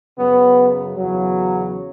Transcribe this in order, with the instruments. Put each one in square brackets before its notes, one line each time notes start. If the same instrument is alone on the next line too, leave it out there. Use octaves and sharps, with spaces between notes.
[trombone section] F#2 C#3 F#3 B3
E2 C#3 F#3